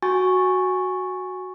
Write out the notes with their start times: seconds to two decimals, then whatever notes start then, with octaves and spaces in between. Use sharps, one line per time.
0.02 F#4 G#5 C#6 A6